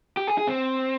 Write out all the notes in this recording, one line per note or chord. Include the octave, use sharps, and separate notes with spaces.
G4
G#4
G#4
C4